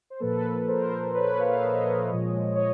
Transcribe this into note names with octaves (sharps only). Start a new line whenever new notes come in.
C5
A#2 F3 A#3 A4 B4
A#4 C5
B4 C#5
F5
E5
C#5 D#5
A#2 F3 G#3
C#5 D#5